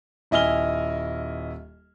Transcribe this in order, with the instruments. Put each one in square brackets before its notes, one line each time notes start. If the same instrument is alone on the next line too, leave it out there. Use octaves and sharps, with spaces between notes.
[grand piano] D#1 E4 D#5 G#5 F6 G7